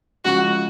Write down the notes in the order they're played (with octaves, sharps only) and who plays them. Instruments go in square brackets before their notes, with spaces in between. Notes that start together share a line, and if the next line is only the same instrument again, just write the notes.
[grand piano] C#3 F3 G#3 C#4 [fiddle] F#4